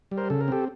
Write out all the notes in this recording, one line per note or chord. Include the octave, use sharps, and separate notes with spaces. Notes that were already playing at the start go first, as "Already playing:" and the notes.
G3
A#4 C5
C#3 A4
A#4
C4 G4 A4